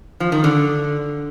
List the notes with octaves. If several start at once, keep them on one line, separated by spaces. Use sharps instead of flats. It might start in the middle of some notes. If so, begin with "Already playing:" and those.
F3
D#3
D3